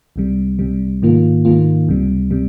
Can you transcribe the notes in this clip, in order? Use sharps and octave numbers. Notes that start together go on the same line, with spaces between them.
C2 C3 G3
C2 C3 G3
G#2 D#3 A#3 F4
G#2 D#3 A#3 F4
C#2 C3 G3
C3 G3